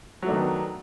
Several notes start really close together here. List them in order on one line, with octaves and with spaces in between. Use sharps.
F#3 A3 D4 D#3 B3